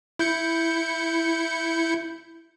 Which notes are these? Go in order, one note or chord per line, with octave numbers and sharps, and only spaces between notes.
E4 G6 C#7